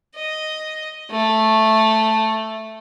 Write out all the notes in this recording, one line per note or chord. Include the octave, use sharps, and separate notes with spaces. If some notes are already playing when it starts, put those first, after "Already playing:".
D#5
A3